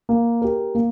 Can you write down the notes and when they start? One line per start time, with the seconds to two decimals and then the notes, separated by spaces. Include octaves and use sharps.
0.09 A#3
0.42 G4 A#4
0.75 A#3